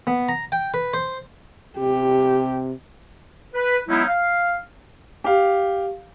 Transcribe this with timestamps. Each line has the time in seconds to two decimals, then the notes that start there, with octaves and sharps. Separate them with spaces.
0.07 B3
0.29 A#5
0.52 G5
0.74 B4
0.94 C5
1.78 C3 G4
3.54 B4
3.88 F#3 G#3 B3 C#4 D#4 E4
4.07 F5
5.24 G4 F5